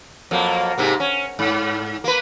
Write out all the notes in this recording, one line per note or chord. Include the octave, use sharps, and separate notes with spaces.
F2 F#3 A#3
G#2 C3 A#3
C#4
G#2
A#3 B4